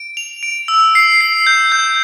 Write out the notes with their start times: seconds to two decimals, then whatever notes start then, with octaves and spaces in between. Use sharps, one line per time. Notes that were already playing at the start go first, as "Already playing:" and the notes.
Already playing: D7
0.17 F7
0.43 D7
0.68 E6
0.95 C7
1.21 C7
1.46 G6
1.72 G6